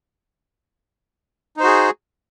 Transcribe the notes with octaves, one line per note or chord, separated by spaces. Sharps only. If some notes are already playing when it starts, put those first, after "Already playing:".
D#4 F#4 G#4 C5